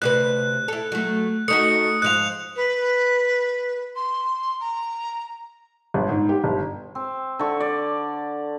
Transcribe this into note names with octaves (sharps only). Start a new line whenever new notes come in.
D2 C3 B4 F#6
E4 A4
F#3 A3
A3 D#4 F#4 D#6 C#7
G#2 F3 F5 F#6 F7
B4
C6
A#5
G1
G#2
G4
G1
C4
D3 C#6
D5